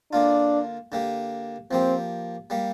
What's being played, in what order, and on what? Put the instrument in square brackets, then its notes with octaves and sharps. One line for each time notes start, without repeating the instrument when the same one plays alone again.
[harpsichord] D3 A#3 F4 [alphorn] D4
[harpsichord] D3 A#3 G4
[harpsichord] F3 A#3 G4 [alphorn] C4
[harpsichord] G3 A#3 G4